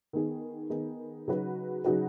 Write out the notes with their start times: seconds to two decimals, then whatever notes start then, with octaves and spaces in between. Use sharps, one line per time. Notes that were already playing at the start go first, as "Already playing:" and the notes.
0.13 D#3 B3 D#4 G#4
0.70 D#3 B3 D#4 G#4
1.28 C#3 F#3 D#4 F#4 B4
1.84 C#3 F#3 D#4 F#4 B4